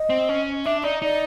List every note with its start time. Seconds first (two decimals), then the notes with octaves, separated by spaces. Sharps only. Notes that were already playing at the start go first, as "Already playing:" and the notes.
Already playing: D#5
0.10 C4
0.29 C#4
0.65 D4 E5
0.83 D#4 D5
1.02 D#4 D5